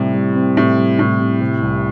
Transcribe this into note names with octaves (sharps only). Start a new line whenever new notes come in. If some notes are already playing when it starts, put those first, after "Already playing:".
Already playing: A2 C3 G3
G3
C4
A2 C3
G3
A2 C3
C3
C3
C2